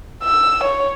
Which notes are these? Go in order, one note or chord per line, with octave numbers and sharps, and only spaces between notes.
E6
C#5